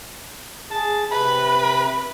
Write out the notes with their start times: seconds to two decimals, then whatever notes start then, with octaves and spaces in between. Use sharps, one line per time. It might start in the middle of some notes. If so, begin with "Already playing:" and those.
0.71 G#4 A5
1.11 C3 B4 B5